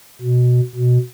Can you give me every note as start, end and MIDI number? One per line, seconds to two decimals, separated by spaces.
0.21 0.60 47
0.75 0.98 47